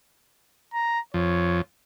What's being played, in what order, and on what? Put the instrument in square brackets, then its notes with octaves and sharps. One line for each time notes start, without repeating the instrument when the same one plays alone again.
[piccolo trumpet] A#5
[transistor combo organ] F2 [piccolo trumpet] C#5